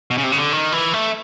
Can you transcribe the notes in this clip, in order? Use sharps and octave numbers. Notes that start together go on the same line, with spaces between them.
B2
C#3
C3
C#3
D3
D#3
E3
A3